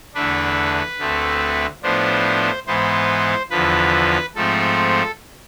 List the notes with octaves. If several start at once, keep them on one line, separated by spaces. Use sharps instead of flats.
E2 D3 A3 D4 B4
D2 D3 A3 C4
A2 F3 B3 D4 C5
G#2 E3 B3 C5
E2 D3 F3 B4
G#2 F3 A3 C4 A4